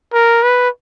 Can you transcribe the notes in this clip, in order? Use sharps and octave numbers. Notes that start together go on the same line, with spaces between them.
A#4
B4